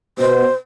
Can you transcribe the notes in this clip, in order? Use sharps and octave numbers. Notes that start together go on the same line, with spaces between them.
B2 C5